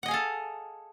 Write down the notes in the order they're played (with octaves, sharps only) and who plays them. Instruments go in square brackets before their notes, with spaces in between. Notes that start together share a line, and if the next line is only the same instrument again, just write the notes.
[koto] F#5
D#5
G#4
F5
A4